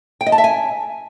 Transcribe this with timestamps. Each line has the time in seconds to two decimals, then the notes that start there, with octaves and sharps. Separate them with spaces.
0.21 G5
0.26 D#5
0.32 A5
0.38 E5
0.44 G#5